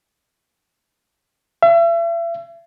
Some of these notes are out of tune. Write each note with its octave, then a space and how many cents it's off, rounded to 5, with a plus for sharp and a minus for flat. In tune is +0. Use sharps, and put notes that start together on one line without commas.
E5 +40